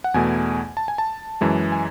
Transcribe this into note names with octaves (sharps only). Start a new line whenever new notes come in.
F#5
E2 B2 A3 G#5
A5
G#5
A5
F#2 E3 G#3
G#5